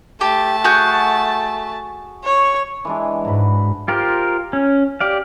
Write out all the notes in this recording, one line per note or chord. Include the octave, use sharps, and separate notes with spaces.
A3 G4 A5
F#4 G#4 G6
C#5 C#6
E3 G#3 D4
G#2 F#3 B4
F4 G4 A#4 C5
C#4
G4 D5 F5